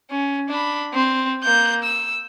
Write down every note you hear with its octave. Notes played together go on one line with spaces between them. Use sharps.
C#4
D4 B5
C4
A#3 G6
E6